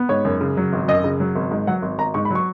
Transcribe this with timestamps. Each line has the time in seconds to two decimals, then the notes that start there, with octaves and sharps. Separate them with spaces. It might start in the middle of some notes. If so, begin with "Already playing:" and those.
Already playing: B3
0.09 G#2 C#5
0.25 F#2
0.41 C#3
0.57 F#3
0.73 G#1
0.88 F#2 D#5
1.04 C#3
1.20 F#3
1.35 G#1
1.51 G#2
1.67 F#3 F#5
1.82 G#1
1.98 G#1 A#5
2.14 G#2 C#6
2.25 B5
2.31 F#3 C#6